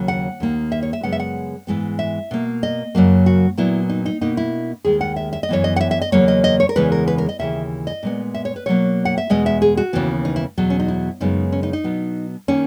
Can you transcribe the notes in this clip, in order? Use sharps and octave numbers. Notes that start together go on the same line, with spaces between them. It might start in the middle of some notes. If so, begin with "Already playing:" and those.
Already playing: D#2 C#3 F#3
F#5
D#2 D#3 A#3
E5
C#5
E5
F#2 C#3 G#3 B3 F#5
E5
F#5
G#2 E3 G#3 B3
E5
B2 A#3
D#5
F#2 C#3 F#3 A#3
F#4
A#2 F#3 B3 E4
D#4
D#4
B2 A#3 D#4
E4
D#2 D#3 G#3 G#4
F#5
E5
E5
D#5
F#2 E3 B3 C#5
D#5
F#5
E5
E5
D#5
E2 C#3 F#3 A#3 C#5
D#5
D#5
C#5
A#4
E2 C#3 E3 G#3 B3 B4
A#4
B4
A#4
D#5
D#2 C#3 E3 E5
D#5
A#2 G#3 B3
E5
C#5
B4
B2 F#3 A#3 C#5
F#5
E5
E2 B2 G#3 B3 D#5
E5
G#4
F#4
D#2 C#3 E3 B3
D#4
E4
E2 B2 F#3
C#4
D#4
E4
F#2 C#3 G#3 B3 D#4
C#4
D#4
D#4
B2 F#3 B3
D#3 A#3 C#4